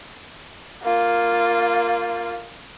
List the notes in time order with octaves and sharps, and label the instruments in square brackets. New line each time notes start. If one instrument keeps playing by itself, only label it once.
[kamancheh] A#3 F4